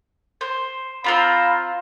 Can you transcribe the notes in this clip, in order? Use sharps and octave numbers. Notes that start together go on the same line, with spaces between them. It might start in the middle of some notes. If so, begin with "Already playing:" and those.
C5
C4 F4 C5 F5 A#5 B5